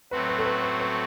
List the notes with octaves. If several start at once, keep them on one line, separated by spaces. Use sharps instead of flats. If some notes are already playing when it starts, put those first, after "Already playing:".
A2 F#3 A3 C4 F#4 B4
B4
A4
B4
B4
B4